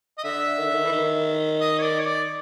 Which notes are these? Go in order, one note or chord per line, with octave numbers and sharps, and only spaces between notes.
D#5
D3 E5
D#3
D3
D#3
E3
D#3
D#5
C#5
D5
C#5
D5